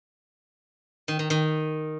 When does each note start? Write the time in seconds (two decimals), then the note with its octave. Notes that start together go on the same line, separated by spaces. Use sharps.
1.08 D#3
1.19 D#3
1.30 D#3